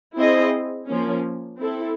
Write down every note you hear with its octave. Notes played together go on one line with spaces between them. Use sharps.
C4 E4 G#4 C5 D#5
F3 A#3 C#4
C4 E4 A4